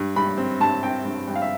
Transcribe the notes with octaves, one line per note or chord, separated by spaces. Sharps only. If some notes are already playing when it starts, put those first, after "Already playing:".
Already playing: G2
G2 B5
C4
G2 A5
C4 G5
G2
G2 G5
F5
E5